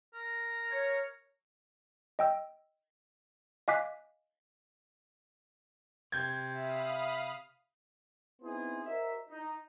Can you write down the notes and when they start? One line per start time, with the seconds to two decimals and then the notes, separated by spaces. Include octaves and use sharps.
0.14 A#4
0.71 C#5
2.19 D#5 G5 E6
3.68 D#5 F5 G#5 D6 F#6 B6
6.12 C3 G6 G#6
6.54 E5 F5 B5 D#6
8.42 B3 C4 D#4 E4 G#4 C5
8.85 F#4 A#4 C5 D#5 E5
9.30 D#4